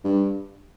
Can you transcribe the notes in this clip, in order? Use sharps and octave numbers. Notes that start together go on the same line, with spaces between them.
G2